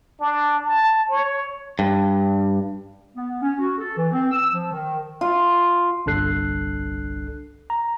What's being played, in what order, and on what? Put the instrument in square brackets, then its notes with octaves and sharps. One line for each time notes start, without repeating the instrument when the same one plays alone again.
[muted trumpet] D4
A5
C#5
[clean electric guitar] G2
[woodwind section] B3
C#4
F#4
A4
E3
C4
E6
F3
D#3
[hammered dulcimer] F4
[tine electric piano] G1 C2 D4 A4 F#6 C7
A#5